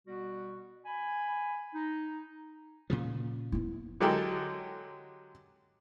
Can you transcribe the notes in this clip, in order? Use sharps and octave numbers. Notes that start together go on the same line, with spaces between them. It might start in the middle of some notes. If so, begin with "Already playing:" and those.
B2 G3 B3 F#4
G#5 B5
D#4
A#2 C#3 F3
B3 E4
D3 F#3 G#3 G4 A4 A#4